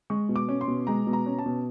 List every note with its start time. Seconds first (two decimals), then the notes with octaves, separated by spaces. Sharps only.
0.10 G#3 C#6
0.29 B2
0.36 D6
0.48 C#4
0.61 C6
0.68 B2
0.87 G#3 A#5
1.07 B2
1.13 A#5
1.26 C#4
1.39 A5
1.46 B2